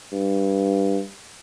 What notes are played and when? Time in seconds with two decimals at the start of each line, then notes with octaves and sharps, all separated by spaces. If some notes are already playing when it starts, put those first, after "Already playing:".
0.12 G2